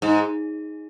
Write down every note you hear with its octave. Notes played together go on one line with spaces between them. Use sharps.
G#2